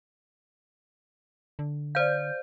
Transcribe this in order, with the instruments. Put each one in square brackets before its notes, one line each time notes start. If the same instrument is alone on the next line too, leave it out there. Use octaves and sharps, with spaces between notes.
[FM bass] D3
[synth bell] C5 G6 [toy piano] D5 F5